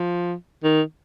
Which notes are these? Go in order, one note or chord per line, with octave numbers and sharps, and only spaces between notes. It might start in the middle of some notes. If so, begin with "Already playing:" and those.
Already playing: F3
D#3